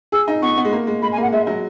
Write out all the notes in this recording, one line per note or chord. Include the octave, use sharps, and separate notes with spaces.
G#4 E6
D#4
B3 C#6
B3
G#3
A#3
G#3
G#3 B5
G#5
A#3
F#5
G#3 E5
F#3